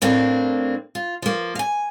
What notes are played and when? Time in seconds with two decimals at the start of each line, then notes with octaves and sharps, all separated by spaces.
0.02 A2 A#3 C4 D4
0.95 F4
1.22 F3 A#3
1.55 F5 G#5